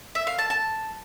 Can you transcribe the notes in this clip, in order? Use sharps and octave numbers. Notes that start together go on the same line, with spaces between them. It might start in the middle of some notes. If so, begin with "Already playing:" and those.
E5
F5
A5
A5